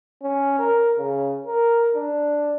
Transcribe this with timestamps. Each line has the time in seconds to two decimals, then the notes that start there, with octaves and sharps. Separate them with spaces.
0.23 C#4
0.60 A#4
0.98 C#3
1.47 A#4
1.95 D4